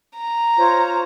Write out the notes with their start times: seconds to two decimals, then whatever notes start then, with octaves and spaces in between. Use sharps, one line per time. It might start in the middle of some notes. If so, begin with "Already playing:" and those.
0.17 A#5
0.59 F4 C5 C#5